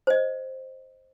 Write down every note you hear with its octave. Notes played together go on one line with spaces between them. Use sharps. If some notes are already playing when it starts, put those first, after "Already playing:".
C5 D#5